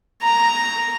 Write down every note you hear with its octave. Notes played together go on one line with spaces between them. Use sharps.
A#5